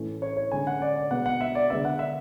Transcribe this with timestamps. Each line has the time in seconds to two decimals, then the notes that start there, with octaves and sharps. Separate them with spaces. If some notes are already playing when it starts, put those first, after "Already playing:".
Already playing: A2 E3 A3 C#4
0.22 C#5
0.37 C#5
0.52 D3 G#3 C#4 G#5
0.67 F#5
0.82 D5
0.96 D5
1.11 B2 G#3 B3 F#5
1.26 F#5
1.41 E5
1.55 D5
1.70 D3 G#3 B3 E5
1.85 F#5
1.99 E5